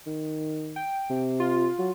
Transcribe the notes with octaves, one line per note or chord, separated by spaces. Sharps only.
D#3
G5
C3
F4
F#3